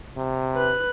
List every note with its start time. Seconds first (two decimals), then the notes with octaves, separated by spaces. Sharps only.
0.17 C3
0.54 B4 F#6